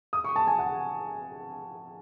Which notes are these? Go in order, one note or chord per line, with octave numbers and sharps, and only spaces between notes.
D#6
C#6
A5
G#5
F#5